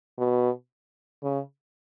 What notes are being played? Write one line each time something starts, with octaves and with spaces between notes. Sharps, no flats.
B2
C#3